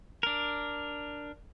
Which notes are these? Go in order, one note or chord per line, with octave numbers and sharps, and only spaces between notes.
D4 A#4